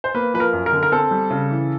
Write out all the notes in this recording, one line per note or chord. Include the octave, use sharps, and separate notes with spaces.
C5
A#3 B4
F3 B4
A#4
F#2
A#4
D3
A#4
C4 A4
G3
C#3
E3